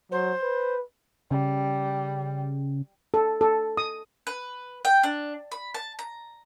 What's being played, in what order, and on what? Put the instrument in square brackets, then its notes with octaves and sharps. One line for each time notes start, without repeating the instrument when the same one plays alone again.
[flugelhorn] F#3 [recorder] C5
[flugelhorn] B4
[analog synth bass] C#3 [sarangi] G3
[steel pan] A4
A4
D#6
[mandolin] B4
G5
D4
B5
A5
A#5